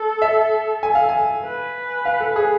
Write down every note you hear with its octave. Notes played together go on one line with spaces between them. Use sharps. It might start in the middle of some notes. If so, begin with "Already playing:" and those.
Already playing: A4
E5
G#5
F5
G#5
B4
F5
A4
G#4